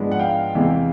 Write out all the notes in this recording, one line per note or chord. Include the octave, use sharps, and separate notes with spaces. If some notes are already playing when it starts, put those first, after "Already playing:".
Already playing: G#2 F3 G#3 B3 D4
F#5
F5 G5
E2 C3 E3 G#3